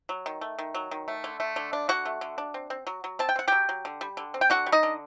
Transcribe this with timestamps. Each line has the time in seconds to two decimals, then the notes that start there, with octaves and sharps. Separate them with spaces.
0.09 F#3
0.26 D#3
0.41 A3
0.58 D#3
0.74 F#3
0.91 D#3
1.08 A3
1.24 D3
1.40 A3
1.56 D3
1.73 D4
1.89 D3 F#4 F#5
2.05 A3
2.21 D3
2.38 D4
2.54 C4
2.70 C4
2.87 F#3
3.04 F#3
3.19 C4 A5
3.29 G5
3.36 C4 F#5
3.48 F#3 G4 G5
3.69 F#3
3.85 D3
4.01 G3
4.17 D3
4.34 C4
4.41 G5
4.50 D3 F#4 F#5
4.66 G3
4.72 D#4 D#5
4.83 D3